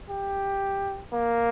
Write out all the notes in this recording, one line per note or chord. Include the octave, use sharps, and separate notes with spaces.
G4
A#3